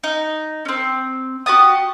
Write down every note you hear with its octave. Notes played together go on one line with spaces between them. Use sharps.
D#4
C4 C#4
F#4 G4 A5 D#6